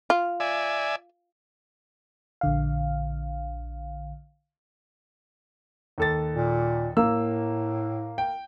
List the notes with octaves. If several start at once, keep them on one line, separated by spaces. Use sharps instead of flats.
F4
D5 E5 G#5
A#1 D3 F5
D#2 A4 A6
A#2
A2 A#3 E6
G5